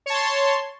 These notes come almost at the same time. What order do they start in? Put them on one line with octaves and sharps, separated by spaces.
C#5 A5 C6